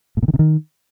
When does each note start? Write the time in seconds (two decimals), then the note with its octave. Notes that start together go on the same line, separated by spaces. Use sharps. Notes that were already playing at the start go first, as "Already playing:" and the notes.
0.17 A2
0.23 A#2
0.28 D#3
0.34 C3
0.39 D#3